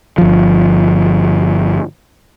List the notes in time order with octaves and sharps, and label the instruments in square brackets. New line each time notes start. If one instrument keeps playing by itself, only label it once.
[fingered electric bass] G1 F3